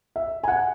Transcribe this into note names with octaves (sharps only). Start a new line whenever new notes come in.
E5
G#5
F#5